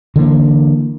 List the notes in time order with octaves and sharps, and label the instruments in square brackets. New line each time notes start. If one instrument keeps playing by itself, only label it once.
[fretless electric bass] D3 E3 G#3 A#3